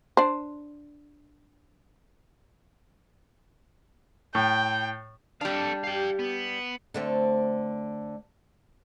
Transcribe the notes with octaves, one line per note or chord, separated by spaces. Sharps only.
D4 C5
A2 G5
G3 D4 A4 F5
G4 F5 G5
B3
D3 A3 C4